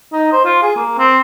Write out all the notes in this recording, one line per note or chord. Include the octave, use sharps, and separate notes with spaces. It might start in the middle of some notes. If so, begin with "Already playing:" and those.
D#4
C5
F4
G#4
A#3
C4